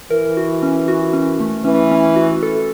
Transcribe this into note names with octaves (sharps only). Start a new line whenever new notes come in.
E3 A#4
F#4
C#4
F#4
C#4
A3
E3 C#4
C#4
F#4
A4